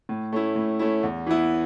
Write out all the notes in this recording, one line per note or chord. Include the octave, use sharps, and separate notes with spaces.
A2
A3 C#4 E4
A2
A3 C#4 E4
E2
E3 B3 E4